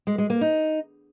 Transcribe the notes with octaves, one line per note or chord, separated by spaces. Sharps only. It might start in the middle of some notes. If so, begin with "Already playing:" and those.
G#3
G#3
A#3
D#4